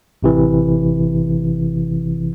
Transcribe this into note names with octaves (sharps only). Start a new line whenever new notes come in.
A1 C3 E3